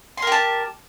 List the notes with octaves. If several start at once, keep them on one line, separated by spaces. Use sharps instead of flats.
G4 A#4 A5 C6